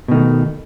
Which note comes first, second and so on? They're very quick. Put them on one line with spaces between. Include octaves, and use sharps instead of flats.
B2 D#3 A3